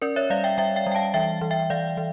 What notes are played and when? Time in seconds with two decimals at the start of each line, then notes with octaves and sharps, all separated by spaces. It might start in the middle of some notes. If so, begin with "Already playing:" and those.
0.02 C#4 A#4 D5
0.16 C#5 E5
0.30 G3 D5 F5
0.44 E5 G5
0.58 G3 E5 G5
0.76 E5 G5
0.87 G3
0.92 G5
0.95 F5 A5
1.14 E3 E5 G5
1.41 E3
1.51 E5 G5
1.70 E3 D5 F5
1.97 E3